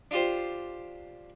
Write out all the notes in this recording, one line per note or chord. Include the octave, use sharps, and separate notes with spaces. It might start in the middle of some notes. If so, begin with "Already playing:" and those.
D4 F4 G4 C5